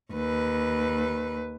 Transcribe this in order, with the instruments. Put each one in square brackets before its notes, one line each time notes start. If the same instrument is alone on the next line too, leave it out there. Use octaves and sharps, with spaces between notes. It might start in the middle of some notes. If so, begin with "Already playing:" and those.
[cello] D#2 B4